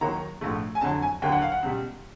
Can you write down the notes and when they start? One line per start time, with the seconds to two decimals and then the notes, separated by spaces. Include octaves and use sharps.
0.01 D#2 D#3 F#3 A#3 A#5
0.41 A#1 G#2 F3 A3
0.75 G#5
0.81 F2 D3 F#3 A5
1.02 G#5
1.22 D#2 D3 F#3 A#3 G5
1.32 F#5
1.42 F5
1.52 F#5
1.63 C#2 B2 G3